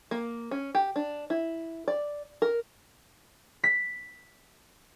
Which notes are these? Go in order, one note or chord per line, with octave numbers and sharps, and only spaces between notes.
A#3
C#4
G4
D4
E4
D5
A#4
B6